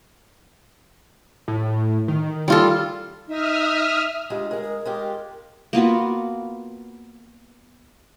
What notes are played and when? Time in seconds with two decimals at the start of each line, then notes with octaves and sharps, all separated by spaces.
1.48 A2
2.08 D#3
2.48 G3 F4 A4
3.28 D#4 E5 D#6 F6
4.30 D2 G#3 F4 G4
4.51 G#3 G#4 A#4
4.63 A#4
4.85 G#3 F4 G4
5.73 A#3 B3 F4 F#4